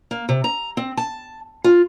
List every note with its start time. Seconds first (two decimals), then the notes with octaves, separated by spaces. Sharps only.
0.11 A#3
0.29 C3
0.44 A#5
0.77 C4
0.97 A5
1.64 F4